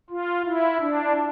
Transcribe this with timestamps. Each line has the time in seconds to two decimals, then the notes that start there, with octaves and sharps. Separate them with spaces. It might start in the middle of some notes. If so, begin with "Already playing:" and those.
0.10 F4
0.46 E4
0.80 D4